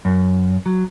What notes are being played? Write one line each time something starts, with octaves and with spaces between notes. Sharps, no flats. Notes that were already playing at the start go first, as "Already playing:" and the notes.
F#2
F#3